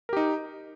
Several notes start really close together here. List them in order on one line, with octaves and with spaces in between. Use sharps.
A#4 G4 D#4